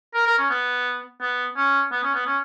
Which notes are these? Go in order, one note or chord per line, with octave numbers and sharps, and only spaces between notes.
A#4
A#4
C#4
B3
B3
C#4
B3
C#4
B3
C#4